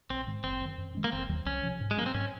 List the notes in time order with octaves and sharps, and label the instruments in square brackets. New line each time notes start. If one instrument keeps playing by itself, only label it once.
[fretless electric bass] A#1 [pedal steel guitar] C4
[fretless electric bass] G#2 D#3 G#3
[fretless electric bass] F#1 [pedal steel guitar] C4
[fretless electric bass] F#2 D#3
F#2
D#3 G#3 C#4
[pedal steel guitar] A#3
[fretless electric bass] F1 [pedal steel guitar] C4
[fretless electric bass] D#2 D#3 F#3
[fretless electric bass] C2 [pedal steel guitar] C#4
[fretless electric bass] C3 F3
G#2
[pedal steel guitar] G#3
[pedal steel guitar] A#3 [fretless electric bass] C#4
[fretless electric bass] F#3 [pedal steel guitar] C4
[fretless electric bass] G#2 [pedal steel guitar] C#4